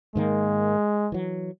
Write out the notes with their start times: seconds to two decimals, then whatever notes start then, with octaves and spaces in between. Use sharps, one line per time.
0.15 G#2 D#3 G#3 A#3
1.12 E3 F#3